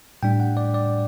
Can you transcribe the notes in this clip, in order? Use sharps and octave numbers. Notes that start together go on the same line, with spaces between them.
A2 G3 D4 G5
F#5
D5
D5